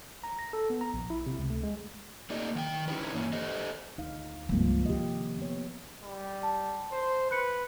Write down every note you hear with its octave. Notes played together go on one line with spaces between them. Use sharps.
A#5
A#6
A4
B3
A#5
A#1
E4
C3
C#2
A3
G#3
A3 A#3 D#4 G4 D5 D#5
D#3 F#5 G5
C#4 D#4 E4 G4 G#4 B4
G2 E3 A#3 C#4
G4 A4 C5 D#5
D2 D#4 F5
C#2 G2 F3 A#3 C4
C3 D#3 G4 D#5
B3 C#5
G3
A5
C5
B4 F#6 C#7